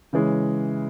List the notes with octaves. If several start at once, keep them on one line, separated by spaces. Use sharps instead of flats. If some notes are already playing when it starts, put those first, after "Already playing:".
C#3 E3 G#3 C#4